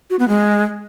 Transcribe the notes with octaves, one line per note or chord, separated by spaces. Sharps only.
F#4
B3
G#3